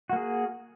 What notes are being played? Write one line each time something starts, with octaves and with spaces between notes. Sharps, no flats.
A#3 F#4 G#4